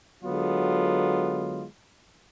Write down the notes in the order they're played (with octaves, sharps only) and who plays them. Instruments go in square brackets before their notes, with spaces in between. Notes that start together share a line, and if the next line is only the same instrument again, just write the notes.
[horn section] D3 F#3 G#3 B3 F4